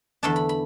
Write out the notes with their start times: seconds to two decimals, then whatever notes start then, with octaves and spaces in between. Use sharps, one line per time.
0.23 E2 D3 A3 D4 A5
0.36 B5
0.49 B5